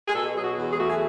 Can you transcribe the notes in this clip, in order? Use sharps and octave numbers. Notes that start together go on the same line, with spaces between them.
G#4
B2 A4
F#3 G#4
F#4
E2
G#4
A3 F#4
G#4